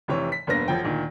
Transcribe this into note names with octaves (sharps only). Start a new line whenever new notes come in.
F1 C3 E3 C#5
B6
F1 G2 A#3 B3 A#6
E1 F3 G5
D2 A#2 D#3